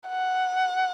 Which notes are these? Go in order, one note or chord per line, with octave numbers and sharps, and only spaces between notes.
F#5